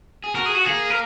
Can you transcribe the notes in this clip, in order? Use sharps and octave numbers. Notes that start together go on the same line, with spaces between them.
G#4
F#4 A#4
G#4
F#4
A#3 G#4
A#4